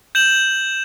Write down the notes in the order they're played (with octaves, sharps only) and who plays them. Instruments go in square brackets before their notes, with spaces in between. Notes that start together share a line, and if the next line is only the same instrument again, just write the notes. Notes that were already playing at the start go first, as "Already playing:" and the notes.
[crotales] G6 E7 F#7